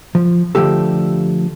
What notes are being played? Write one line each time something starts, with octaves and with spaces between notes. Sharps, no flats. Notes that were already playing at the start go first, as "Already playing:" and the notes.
F3
D3 E3 F3 A3 G4 A4